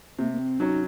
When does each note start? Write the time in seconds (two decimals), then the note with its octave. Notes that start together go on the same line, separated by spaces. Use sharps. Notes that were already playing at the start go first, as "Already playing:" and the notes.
0.19 C3 A#3
0.32 A#3
0.39 C4
0.60 F#3 C#4 D#4